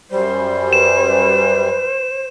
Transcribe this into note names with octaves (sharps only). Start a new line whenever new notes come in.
F#2 G3 C5
B4 E7